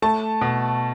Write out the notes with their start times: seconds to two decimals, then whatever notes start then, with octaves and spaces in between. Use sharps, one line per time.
0.02 A3 A5
0.41 B2